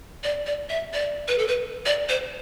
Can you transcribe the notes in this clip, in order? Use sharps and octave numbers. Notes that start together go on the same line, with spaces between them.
D5
D5
E5
D5
B4
A4
B4
D5
C5